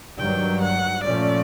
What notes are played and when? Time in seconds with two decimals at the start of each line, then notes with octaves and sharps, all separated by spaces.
0.18 G2 D#3 F#3 G5
0.61 F#5
1.04 A#2 F3 A3 C#4 D5